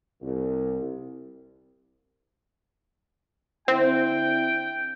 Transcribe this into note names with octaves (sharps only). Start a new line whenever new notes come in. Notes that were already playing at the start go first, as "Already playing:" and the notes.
C2
D3 C4 E4 G5